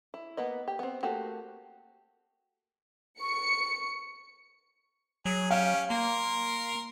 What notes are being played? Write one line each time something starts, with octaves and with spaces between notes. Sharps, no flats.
E4
A#3 B3 B4 D#5
G4
B3 C4
A3 A#3 F#4 G4
C#6 C#7
F#3 G#4
C#4 G4 F5
A#3 A#4 C6